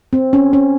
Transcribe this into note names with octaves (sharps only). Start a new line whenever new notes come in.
C4
C#4
C#4